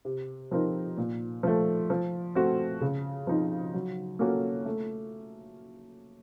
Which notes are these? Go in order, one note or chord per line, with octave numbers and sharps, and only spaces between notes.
C3
F3 C4 D#4 A#4
A#2
F3 A3
F3
A3 C4 F#4
C#3
F3 C4 D#4
F#3
A#3 C#4 F#4 A4
A3